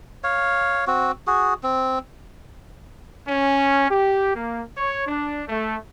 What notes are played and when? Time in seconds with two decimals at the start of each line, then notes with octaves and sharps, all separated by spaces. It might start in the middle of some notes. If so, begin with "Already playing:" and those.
0.24 C#5 F5
0.87 C4 F#4
1.27 F#4 G#4
1.63 C4
3.28 C#4
3.90 G4
4.36 A#3
4.77 C#5
5.07 D4
5.48 A3